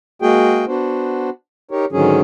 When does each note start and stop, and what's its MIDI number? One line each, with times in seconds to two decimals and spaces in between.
0.22 0.65 56
0.22 0.65 58
0.22 0.65 66
0.22 0.65 68
0.22 0.65 79
0.67 1.30 59
0.67 1.30 62
0.67 1.30 66
0.67 1.30 72
1.71 1.85 63
1.71 1.85 67
1.71 1.85 70
1.71 1.85 73
1.92 2.22 44
1.92 2.22 50
1.92 2.22 51
1.92 2.22 54
1.92 2.22 61
1.92 2.22 68